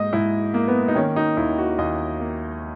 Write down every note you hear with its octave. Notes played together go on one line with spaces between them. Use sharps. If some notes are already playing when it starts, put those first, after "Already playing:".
Already playing: G#2 A#3 D#5
G#2 E4
A#3
B3
D#4
D#3 C#4
D#4
D#2 E4
F#4
D#2 D#5
A#3